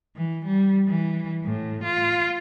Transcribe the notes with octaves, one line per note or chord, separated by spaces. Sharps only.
E3
G3
E3
A2
F4